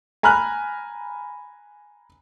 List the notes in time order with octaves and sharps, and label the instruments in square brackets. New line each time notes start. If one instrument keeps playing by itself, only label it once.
[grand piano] G#5 A#5 B5 F6 F#6